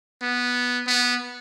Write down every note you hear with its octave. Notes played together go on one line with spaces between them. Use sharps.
B3
B3